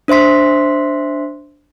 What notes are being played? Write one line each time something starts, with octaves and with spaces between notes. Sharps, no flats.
D4 C5 E5 C6 B6